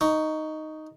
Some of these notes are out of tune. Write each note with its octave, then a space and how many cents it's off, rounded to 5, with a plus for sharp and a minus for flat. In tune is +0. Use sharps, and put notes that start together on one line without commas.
D#4 +0 C#6 +10